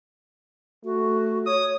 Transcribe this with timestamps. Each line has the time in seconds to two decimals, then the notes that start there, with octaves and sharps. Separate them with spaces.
0.85 A3 F#4
1.46 C#5 D#6